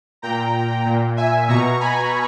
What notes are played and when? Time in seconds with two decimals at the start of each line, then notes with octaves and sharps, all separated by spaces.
0.22 A#2 G5 A#5
0.86 A#2
1.17 E5 G#5
1.48 B2 A#5 C#6
1.80 G#5 B5